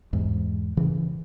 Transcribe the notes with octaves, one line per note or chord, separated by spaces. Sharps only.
E2 G#2
C#3 E3